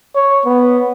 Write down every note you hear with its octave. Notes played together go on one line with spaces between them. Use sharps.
C#5
B3